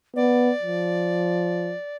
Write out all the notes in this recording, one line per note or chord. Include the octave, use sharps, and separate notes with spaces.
B3 D5
F3